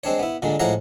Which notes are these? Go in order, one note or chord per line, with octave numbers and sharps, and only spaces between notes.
G#3 C4 D4 C#5
B3 E4
A#2 D3 G#3
A2 F3 G#3 C#5 F#5 A#5